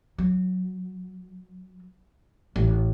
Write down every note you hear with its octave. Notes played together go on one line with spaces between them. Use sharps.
F#3
A1